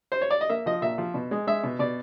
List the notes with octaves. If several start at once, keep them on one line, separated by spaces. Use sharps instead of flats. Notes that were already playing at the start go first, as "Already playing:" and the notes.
C5
C#5
D5
D#5
A#3 E5
F3 D#5
A#2 E5
F3
B2
G#3
G#3 E5
B2
B2 D5